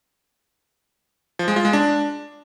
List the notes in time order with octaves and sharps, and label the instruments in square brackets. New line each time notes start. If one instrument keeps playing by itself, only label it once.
[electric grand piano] F3
G#3
F4
G#3
D4